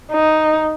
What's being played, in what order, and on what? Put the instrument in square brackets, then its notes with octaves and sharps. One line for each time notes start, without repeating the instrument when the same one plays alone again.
[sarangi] D#4